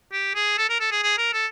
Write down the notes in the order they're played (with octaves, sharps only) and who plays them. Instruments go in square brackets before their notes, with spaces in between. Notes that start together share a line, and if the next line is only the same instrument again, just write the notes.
[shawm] G4
G#4
A4
A#4
A4
G#4
G#4
A#4
A4